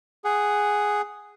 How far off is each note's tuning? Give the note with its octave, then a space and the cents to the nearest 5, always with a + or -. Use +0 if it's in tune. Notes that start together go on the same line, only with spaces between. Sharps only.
G#4 +0 F#5 +10